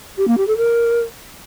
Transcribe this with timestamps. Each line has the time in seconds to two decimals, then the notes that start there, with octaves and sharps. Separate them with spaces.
0.18 G4
0.28 A#3
0.37 G4
0.47 A4
0.57 A#4